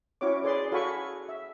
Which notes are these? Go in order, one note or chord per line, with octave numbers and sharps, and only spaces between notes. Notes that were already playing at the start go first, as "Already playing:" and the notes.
C#4 E4 F#4 C#5 D6
G#4 B4 D5 C6
F#4 A4 F5 G#5 B5 C#6
E5